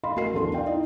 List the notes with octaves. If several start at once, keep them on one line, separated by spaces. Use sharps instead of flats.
D#5 F5 B5 C6
A1 F#4 A#4 C7
B1 E2 D4 A4 C6
D5 F5 G5
D#4 E4 D#5